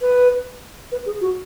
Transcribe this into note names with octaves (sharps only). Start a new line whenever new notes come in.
B4
B4
G#4
F#4